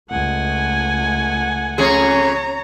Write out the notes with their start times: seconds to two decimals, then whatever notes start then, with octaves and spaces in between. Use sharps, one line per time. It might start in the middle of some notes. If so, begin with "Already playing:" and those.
0.10 C#2 A3 F#5 G#5
1.78 F2 C#4 G#4 C#5 A#5